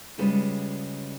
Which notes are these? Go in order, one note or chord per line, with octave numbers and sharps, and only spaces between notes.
C#3 G3 G#3 C#4 F4 B4